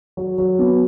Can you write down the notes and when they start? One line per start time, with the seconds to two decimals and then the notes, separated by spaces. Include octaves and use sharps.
0.17 F#3
0.38 F#3
0.59 B3